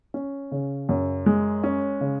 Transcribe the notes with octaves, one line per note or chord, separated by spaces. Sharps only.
C#4
C#3
F#2
G#3
C#4
C#3